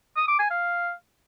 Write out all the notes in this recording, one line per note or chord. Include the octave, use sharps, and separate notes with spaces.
D#6
D6
G#5
F5